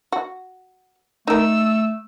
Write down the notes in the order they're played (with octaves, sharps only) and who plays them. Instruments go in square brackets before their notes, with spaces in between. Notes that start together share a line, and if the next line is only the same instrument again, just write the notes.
[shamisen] F#4
[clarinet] A3 [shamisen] D#4 A#4 [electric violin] E6